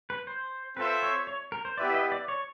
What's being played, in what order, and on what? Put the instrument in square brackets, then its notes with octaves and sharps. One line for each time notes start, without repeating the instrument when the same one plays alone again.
[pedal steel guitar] B4
C5
[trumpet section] C4 F4 A4 C5 E5 [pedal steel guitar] B4
[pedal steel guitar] C#5
C#5
A#4
C5
[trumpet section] B3 E4 G4 B4 E5 [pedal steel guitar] D5
[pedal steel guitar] D#5
D5
C#5